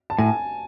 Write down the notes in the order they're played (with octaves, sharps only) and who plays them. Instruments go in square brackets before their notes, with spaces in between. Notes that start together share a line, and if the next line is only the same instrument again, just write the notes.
[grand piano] A5
[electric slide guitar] A2 [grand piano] G#5